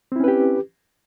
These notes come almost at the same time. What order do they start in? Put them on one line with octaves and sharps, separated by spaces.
C4 E4 C#4 B4 G4